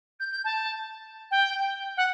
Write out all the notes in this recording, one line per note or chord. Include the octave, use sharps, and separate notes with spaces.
G6
G6
A5
G5
F#5